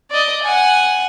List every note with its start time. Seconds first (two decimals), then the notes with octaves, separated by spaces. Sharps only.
0.11 D5 D#5
0.43 F#5 G#5